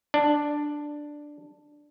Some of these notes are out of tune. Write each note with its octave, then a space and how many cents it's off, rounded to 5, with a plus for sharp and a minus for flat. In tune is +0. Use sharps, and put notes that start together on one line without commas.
D4 +5